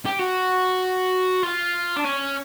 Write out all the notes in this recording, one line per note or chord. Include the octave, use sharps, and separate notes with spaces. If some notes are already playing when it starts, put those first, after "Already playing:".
G4
F#4
F4
D4
C#4